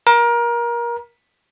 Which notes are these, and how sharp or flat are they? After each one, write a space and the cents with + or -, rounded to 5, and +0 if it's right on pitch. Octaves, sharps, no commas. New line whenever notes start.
A#4 +25